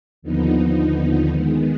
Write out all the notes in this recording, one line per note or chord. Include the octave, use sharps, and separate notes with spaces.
D#2 D3 F3 B3 D#4
D#3 G#3 B3